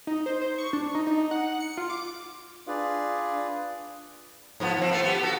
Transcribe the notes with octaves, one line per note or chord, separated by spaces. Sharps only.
D#4
C5
C5
C#6
D4
D#4
D#4
F#5
C#7
F4
D6
D4 F4 G#4 B4 D5
G#2 F3 B3
F3 C4
A3 B3 F4
B3 G4
F#4 A4